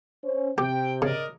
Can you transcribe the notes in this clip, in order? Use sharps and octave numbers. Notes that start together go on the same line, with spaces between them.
C#4 C5
C3 G4 G5
C#3 A#4 D5 D#5